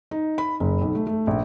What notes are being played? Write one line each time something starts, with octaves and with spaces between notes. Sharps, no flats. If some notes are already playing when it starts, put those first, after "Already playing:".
D#4
B5
F#1
B1
A3
A3
A#1